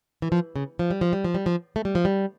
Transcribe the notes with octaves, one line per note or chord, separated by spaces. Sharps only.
E3
F3
C#3
F3
G3
F3
G3
F3
G3
F3
A3
G3
F3
G3